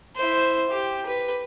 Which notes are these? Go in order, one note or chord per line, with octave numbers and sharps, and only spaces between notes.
E4 C5
G4
B4